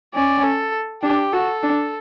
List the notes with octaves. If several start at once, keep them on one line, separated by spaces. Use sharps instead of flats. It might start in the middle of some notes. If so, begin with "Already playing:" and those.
C#4 D5
A4
D4 G4
F#4 A4
D4